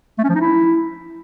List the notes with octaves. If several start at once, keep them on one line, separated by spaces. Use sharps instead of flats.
A3
C#4
F3
D#4
E4